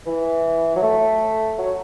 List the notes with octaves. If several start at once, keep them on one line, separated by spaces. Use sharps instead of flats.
E3
F#3
A3
F#3